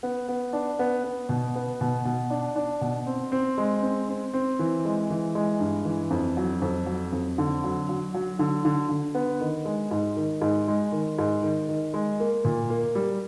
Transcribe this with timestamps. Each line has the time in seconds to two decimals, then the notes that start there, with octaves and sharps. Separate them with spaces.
0.03 B3
0.29 B3
0.53 D4
0.79 B3
1.04 B3
1.29 B2
1.55 B3
1.81 B2
2.05 B2
2.30 D4
2.56 D4
2.81 B2
3.07 C4
3.32 C4
3.58 G#3
3.82 C4
4.09 C4
4.33 C4
4.59 E3
4.85 G#3
5.10 E3
5.35 G#3
5.60 G2
5.85 E3
6.10 F2
6.37 F#3
6.62 F2
6.87 F#3
7.12 F2
7.38 D3
7.64 F#3
7.89 F#3
8.14 F#3
8.39 D3
8.65 D3
8.90 D3
9.15 B3
9.40 D#3
9.65 G#3
9.91 G#2
10.17 D#3
10.42 G#2
10.68 G#3
10.92 D#3
11.19 G#2
11.43 D#3
11.69 D#3
11.94 G#3
12.20 A#3
12.45 A#2
12.70 A#3
12.95 G3